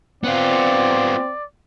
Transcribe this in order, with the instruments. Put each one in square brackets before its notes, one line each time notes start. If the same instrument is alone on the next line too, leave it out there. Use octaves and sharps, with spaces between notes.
[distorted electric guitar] B3 F4 [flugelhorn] C4 [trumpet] D5